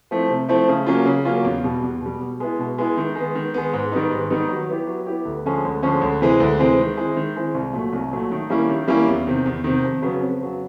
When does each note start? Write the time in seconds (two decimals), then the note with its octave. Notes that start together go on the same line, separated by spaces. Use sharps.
0.11 F3 A3 C4 E4
0.29 C3
0.49 F3 A3 C4 E4
0.69 C#3
0.86 F#3 A#3 C#4 F4
1.06 C#3
1.25 F#3 A#3 C#4 F4
1.44 E2
1.64 B2 G3
1.82 E2
2.01 B2
2.06 G3
2.20 B2
2.40 G#3 B3 E4
2.59 B2
2.78 G#3 B3 E4
2.97 D#3
3.15 G#3
3.20 B3
3.35 D#3
3.54 G#3 B3
3.73 G#2
3.92 D#3 G3 B3 D#4
4.11 G#2
4.30 D#3 G3 B3 D#4
4.50 F#3
4.69 B3 E4 G4
4.87 F#3
5.06 B3 E4 G4
5.25 D2
5.45 D3 F3 G#3 C#4
5.65 D2
5.82 D3 F3 G#3 C#4
6.01 D2
6.21 C3 E3 G#3 C4
6.40 D2
6.59 C3 E3 G#3 C4
6.79 D#3
6.97 G#3 C4 E4
7.17 D#3
7.36 G#3 C4 E4
7.55 C2
7.73 A#2 F#3 A3
7.93 C2
8.11 A#2 F#3 A3
8.32 D#3
8.50 G3 A#3 C#4 E4
8.69 D#3
8.88 G3 A#3 C#4 E4
9.08 E2
9.27 C3 D#3
9.46 E2
9.64 C3 D#3
9.84 F2
10.02 C#3 F#3 B3
10.21 F2
10.41 C#3 F#3 B3